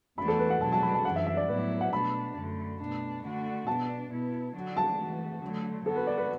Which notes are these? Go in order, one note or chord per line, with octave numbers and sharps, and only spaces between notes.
E2 E3 A3 D4 F#4 B5
A4
B4
F#5
B2 F#3 D4 F#4 A5
A5
B5
A5
F#2 E3 D4 F#5
E5
E5
D5
A2 F#3 B3 E4 B4
D5
F#5
B2 A3 D4 B5
F#2 D3 A3
B2 A3 D4
D3 A3 D4 F#4
B2 B3 D4 A5
B2 B3 E4
D3 F#3 D4 F#4
A5
E3 A3 F#4
D3 F#3 A3
D3 B3 F#4 A4
B4
D5
B4